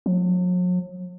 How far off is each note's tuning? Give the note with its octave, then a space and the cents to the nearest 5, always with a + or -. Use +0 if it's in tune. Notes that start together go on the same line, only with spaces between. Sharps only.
F#3 -45